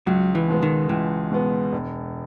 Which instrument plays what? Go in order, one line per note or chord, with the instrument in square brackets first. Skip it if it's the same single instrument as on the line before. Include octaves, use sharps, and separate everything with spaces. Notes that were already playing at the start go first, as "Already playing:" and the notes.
[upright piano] C#2 [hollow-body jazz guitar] F#3
[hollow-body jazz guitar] E3
[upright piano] B2 G#3 B3
[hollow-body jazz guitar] D#3
[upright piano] C#2 [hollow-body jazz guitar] E3
[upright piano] B2 G#3 B3
E1